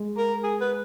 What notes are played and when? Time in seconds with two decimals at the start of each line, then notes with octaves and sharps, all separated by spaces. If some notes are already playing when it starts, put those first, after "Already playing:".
Already playing: G#3
0.17 A#4
0.43 G#4
0.61 B4